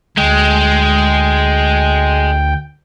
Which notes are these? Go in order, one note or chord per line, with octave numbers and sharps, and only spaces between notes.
D2 G#3 G5